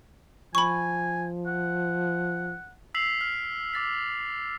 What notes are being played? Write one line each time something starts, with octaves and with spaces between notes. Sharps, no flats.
F3 G#5 B5 C#6
F#5
E6 B6 C7 F7 F#7
F6
D6 A6 B6